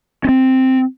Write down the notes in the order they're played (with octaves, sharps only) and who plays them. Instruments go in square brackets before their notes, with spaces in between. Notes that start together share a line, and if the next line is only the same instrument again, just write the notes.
[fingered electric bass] C4 C#4